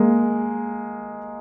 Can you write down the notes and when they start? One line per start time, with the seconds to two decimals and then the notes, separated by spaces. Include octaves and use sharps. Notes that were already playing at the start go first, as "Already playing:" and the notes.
Already playing: G#3 A#3